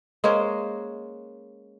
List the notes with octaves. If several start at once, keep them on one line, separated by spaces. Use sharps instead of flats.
G#3 A#3 C#4 C5